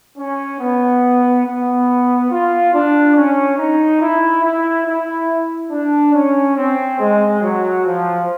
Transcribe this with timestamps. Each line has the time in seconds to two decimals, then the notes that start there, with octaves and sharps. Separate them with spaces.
0.18 C#4
0.60 B3
1.46 B3
2.31 F4
2.74 D4
3.16 C#4
3.58 D#4
4.02 E4
4.44 E4
4.86 E4
5.71 D4
6.14 C#4
6.57 C4
7.00 G#3
7.42 F#3
7.85 F3